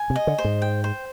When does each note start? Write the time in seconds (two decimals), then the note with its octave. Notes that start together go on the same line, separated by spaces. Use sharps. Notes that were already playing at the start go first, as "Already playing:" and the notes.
Already playing: G#5
0.10 C3
0.16 D#5
0.27 D3
0.38 C5
0.44 G#2
0.62 G5
0.84 C5